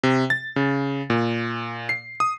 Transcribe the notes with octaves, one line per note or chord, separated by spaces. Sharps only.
C3
A6
C#3
A#2
C7
D#6